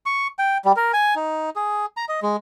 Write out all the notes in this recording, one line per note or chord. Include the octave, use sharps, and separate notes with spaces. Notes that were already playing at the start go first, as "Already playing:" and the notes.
C#6
G5
G3
A#4
G#5
D#4
G#4
A#5
D#5
G#3